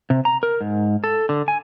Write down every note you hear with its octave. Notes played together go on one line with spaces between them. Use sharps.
C3
A#5
A#4
G#2
A4
D3
G#5